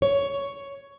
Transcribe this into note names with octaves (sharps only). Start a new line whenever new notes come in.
C#5